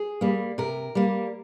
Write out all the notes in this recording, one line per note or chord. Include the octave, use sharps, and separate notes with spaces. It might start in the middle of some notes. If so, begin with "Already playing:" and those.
Already playing: G#4
G3 A#3
C3 A#4
G3 A#3